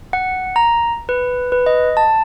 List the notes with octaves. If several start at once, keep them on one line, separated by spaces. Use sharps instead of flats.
F#5
A#5
B4
B4
D#5
A5